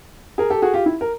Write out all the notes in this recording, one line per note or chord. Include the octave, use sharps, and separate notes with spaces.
G#4 A#4
G4 A4
F#4 G#4
F4 G4
E4
A#4